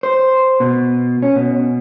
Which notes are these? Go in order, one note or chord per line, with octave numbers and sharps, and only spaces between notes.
C5
B2
C#4
B2